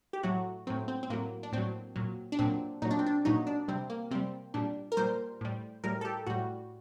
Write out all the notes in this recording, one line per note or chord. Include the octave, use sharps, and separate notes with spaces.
G4
A2 F#3 F#4
A2 F#3 C4
C4
C4
A2 F#3 A#3
D4
A2 F#3 C4
A#2 F#3
D4
A#2 F#3 C4
A#2 F#3 D#4
D4
C4
D4
A#2 F#3 D#4
D4
C3 G3 C4
A#3
C3 G3 C4
A#2 G3 D4
A#4
A#2 G3 C5
A2 G3
A2 G3 A#4
A4
G4
A2 G3 F#4